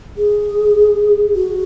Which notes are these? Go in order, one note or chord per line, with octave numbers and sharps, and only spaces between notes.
G#4
F#4